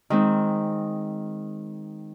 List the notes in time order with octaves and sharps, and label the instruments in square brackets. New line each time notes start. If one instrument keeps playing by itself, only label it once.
[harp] D#3 G#3 C4